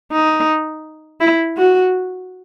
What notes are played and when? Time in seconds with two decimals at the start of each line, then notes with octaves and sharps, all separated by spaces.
0.12 D#4
1.21 E4
1.58 F#4